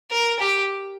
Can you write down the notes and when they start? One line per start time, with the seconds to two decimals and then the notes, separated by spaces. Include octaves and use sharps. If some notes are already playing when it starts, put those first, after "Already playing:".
0.11 A#4
0.40 G4